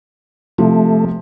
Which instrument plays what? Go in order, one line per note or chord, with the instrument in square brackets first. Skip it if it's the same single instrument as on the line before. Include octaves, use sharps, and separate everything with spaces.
[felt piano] C3 F3 [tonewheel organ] A3